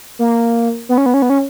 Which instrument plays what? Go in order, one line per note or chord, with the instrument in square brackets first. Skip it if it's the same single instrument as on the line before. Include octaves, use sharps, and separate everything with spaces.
[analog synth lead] A#3
B3
C#4
B3
C#4
B3
C#4